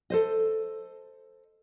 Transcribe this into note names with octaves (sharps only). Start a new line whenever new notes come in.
A4 C5 D#5